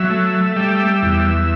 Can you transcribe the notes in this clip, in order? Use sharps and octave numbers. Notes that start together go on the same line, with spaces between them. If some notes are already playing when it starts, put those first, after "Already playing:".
Already playing: F#3 E5
A3
G3 E5
E2